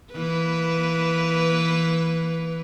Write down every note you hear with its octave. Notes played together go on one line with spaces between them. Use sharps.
E3 A#3 B4